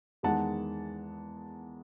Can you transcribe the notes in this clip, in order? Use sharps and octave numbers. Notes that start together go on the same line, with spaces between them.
E2 D#3 G#3 F#5 A5